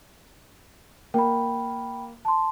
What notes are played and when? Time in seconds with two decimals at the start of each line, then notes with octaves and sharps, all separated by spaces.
1.14 A#3 G5 B5
2.25 A5 C6